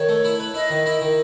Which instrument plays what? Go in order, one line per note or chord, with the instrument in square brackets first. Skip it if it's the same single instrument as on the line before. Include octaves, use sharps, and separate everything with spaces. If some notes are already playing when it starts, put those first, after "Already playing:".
Already playing: [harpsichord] D#3 [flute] C#5
[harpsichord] A3
E4
B4
[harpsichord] E4 [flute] D#5
[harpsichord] D#3
E4
D#3